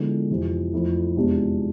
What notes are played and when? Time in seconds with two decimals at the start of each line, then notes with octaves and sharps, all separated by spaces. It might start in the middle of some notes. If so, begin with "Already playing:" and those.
Already playing: D3 F3 G#3 B3 E4
0.30 F2 C3 E3
0.73 F2 E3 A3 E4
1.16 E2 C3 F3 G#3 D4